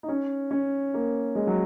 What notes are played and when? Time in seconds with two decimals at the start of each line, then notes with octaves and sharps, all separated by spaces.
0.03 D#4
0.08 C#4
0.51 C#4
0.94 A#3
1.35 G#3
1.47 F#3